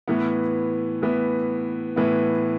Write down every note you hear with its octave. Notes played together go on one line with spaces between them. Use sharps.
A2 E3 B3
A2 E3 B3
A2 E3 B3